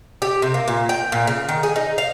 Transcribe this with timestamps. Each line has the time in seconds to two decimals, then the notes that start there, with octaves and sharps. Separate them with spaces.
0.22 G4
0.42 C3
0.54 A#3
0.68 A#2
0.89 G5
1.12 A#2
1.27 C#3
1.49 D#3
1.63 G#4
1.76 D#4
1.98 F5